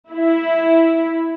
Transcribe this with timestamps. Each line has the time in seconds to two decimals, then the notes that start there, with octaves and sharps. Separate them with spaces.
0.11 E4